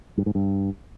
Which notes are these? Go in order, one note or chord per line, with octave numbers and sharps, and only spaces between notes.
G2
G#2
G2